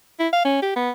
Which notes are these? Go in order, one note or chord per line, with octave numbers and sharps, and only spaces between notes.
E4
F5
C#4
G4
B3